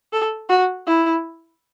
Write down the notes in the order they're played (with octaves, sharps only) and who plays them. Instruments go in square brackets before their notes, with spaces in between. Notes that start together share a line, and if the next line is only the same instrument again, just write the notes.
[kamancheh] A4
F#4
E4